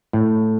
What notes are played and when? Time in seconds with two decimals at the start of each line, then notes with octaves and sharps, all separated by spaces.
0.13 A2